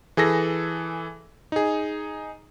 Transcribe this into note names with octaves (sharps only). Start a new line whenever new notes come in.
E3 G#4 A4 A#6
D#4 G#4